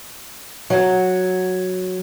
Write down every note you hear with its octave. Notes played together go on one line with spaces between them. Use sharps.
F#3